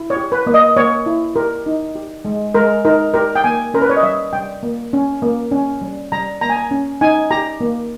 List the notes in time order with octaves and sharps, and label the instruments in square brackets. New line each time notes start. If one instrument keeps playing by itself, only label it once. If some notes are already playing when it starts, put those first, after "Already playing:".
Already playing: [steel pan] E4
C#5
G4
B4
A#3
D#5
A#3 C#5
E4
G4 A#4
D#4
G4
G#3
G#3 A#4
D#4 A#4
G4 A#4
G5
A#3 G#5
C#4 A#4
B4
C#5
D#5
G3 E5
G3 G5
A#3
C#4
A#3
C#4
G3
G3 A#5
A#3 A#5
G#5
A#5
C#4
D#4 G#5
G4 A#5
A#3